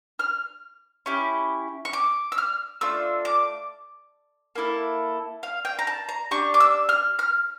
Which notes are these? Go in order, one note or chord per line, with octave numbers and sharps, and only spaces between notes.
F6
C#4 E4 G4
C#6
D6
E6
F6
A3 D4 F4 E6
D6
A#3 E4 A4
F5
G5
A#5
A5
A#5
D4 G4 C#6
D6
E6
F6
F6